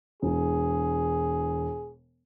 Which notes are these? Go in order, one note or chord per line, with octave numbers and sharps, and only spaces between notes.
E1 G#4